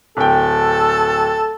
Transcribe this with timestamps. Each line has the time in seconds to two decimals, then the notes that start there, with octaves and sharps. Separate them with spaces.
0.17 D1 A4 G5